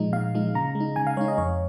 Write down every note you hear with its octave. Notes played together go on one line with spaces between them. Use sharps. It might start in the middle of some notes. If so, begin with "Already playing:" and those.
Already playing: A#2 F3 G#3 D#4
A#2 F5
F3 G#3 D#4
C#3 A#5
G#3
D#4
C#3 G#5
F5
G#3 D#4 C#5
D#5
F2 C#5